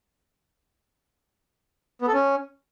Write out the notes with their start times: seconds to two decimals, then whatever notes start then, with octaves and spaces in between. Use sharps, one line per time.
2.02 B3
2.08 A4
2.13 C#4